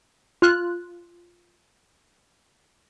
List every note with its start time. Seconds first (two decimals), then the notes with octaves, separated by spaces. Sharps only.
0.42 F4 F#6